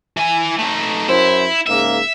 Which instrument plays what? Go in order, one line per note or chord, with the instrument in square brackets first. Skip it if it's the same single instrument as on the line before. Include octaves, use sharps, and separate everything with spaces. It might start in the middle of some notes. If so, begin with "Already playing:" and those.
[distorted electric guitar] E3 G#5
A3 D#4
[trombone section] F#2 C5 [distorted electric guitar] E4
[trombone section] G#2 C#3 A#3 [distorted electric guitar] E5